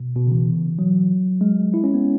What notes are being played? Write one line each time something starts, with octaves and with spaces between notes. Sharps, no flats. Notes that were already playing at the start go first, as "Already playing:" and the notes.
Already playing: B2
B2
C#3
E3
F#3
G#3
E4
C#4
B3